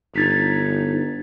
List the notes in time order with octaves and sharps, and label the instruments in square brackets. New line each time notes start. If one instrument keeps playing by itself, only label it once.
[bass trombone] G1 [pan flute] D#4 [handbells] G#6 A6 B6